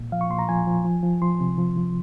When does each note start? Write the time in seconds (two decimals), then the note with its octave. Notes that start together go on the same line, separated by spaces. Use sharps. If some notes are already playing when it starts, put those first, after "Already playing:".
Already playing: A#2
0.12 F3 F5
0.21 C#6
0.30 A#2 C6
0.39 A#5
0.49 F3 G#5
0.67 F3
0.85 F3
1.03 F3
1.22 F3 C6
1.40 C3
1.58 F3
1.77 F3